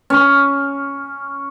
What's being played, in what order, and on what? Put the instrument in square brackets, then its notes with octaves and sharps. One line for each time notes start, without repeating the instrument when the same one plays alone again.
[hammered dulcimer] C#4